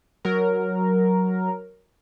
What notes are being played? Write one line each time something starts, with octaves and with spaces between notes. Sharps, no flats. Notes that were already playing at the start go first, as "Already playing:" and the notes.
F#3 A#4